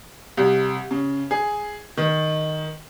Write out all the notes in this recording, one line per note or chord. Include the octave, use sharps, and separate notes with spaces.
C2
C#3
G#4
D#3